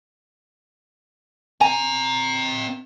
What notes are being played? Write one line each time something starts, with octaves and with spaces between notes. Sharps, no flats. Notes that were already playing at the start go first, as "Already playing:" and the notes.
C4 G#5 A#5